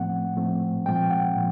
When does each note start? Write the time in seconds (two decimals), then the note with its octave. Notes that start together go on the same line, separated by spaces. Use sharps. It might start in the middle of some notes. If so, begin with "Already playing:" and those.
Already playing: A2 F3 A3 C4 F#5
0.36 A2 F3 A3 C4
0.86 A#2 F3 G#3 C4 G5
1.10 F#5
1.36 A#2 F3